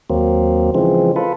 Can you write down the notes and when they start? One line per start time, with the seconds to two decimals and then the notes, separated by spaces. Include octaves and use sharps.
0.10 D#2 F#3 A#3 C4
0.75 C#3 E3 F3 G#3 C4
1.16 F4 A4 B4